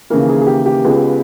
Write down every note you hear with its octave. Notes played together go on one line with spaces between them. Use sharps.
D#2 C#3 E3 A#3 A#4
G#4
G#4
G4
G4
C#2 C#3 G#3 B3